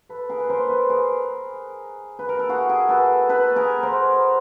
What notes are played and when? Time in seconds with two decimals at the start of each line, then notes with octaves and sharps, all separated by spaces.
0.09 A4 B4
0.29 G#4 A#4
0.40 B4
0.50 A#4 C5
0.69 A4 B4
0.90 G#4 A#4
2.19 B4
2.29 A#4
2.39 A4
2.49 F#4 G#4
2.69 G#4 A#4
2.89 A4 B4
3.29 A4 B4
3.56 G#4 A#4
3.83 A#4 C5